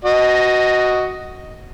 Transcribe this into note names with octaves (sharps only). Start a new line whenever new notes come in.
F#4 D#5